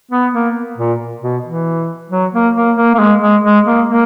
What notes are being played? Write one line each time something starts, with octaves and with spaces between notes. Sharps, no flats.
B3
A#3
A#2
B2
E3
F#3
A#3
A#3
A#3
A#3
G#3
G#3
G#3
A#3
A#3